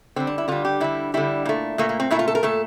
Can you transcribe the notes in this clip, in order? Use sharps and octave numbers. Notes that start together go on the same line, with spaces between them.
D3 G3 C4
D4
E4
D3 G3 F4
G4
D3 G3 E4
D3 G3 E4
A#2 A3
A#2 A3 A#3
A#3
C4
A#2 A3 E4
F4
A4
A#4
A#2 A3 A4